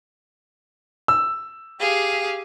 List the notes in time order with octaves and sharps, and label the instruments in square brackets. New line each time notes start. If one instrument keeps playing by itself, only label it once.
[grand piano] E6
[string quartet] G4 G#4 F5